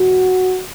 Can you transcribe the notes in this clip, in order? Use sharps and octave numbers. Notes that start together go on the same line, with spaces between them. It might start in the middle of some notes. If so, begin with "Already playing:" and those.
Already playing: E2 B2 F#4